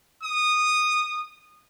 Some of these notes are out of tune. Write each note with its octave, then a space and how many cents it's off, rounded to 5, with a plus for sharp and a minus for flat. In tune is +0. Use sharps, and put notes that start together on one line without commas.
D#6 -15